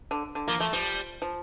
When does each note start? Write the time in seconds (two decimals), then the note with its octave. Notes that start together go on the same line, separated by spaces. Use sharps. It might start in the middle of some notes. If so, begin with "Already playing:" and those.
0.11 D3
0.35 D3
0.48 F3 A#3
0.60 F3 A3
0.73 F3 G3
1.22 F3